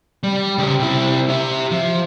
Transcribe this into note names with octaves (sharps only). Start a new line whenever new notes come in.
G3
C#3 G4
C3 E4
G4 E5
F3